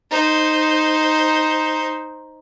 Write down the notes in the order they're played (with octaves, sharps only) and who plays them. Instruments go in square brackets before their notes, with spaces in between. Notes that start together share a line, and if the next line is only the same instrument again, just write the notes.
[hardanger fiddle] D#4 C5